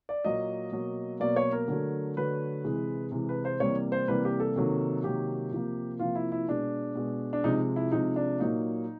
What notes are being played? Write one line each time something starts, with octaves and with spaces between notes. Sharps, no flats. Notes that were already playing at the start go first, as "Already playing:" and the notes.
D5
A#2 F#3 A#3 D#5
B2 F#3 A#3
B2 F#3 A#3 D5
C#5
A#4
D3 F#3 A3
D3 F#3 A3 B4
C3 E3 G#3
C3 E3 G#3
B4
C5
C3 E3 G3 A#3 C#5
C5
C3 E3 G3 A#3 B4
G4
A4
C3 D#3 F#3 A#3
C3 D#3 F#3 A#3 G4
C3 F3 A#3
C3 F3 A#3 F4
E4
E4
B2 G#3 D4
B2 G#3
D4
C3 F3 G#3 D#4
E4
C3 F3 G#3 D#4
D4
A#2 F#3 A#3 D#4